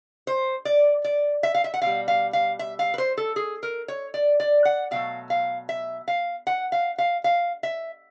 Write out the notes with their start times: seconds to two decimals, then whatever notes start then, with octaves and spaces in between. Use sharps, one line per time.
0.27 C5
0.65 D5
1.04 D5
1.43 E5
1.55 F5
1.64 E5
1.74 F#5
1.82 B2 G3 F5
2.08 F5
2.33 F5
2.59 E5
2.79 F5
2.94 B4
2.98 C5
3.17 A4
3.36 G#4
3.63 A#4
3.88 C#5
4.14 D5
4.40 D5
4.65 F#5
4.91 B2 F#3 A3 F5
5.30 F5
5.69 E5
6.08 F5
6.47 F#5
6.72 F5
6.98 F5
7.24 F5
7.63 E5